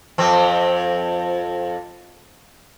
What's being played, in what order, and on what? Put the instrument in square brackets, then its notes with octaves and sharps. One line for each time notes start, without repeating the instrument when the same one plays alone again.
[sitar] F2 C4